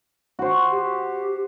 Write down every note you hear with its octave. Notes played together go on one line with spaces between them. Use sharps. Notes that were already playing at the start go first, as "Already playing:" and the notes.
F#4 C5
G4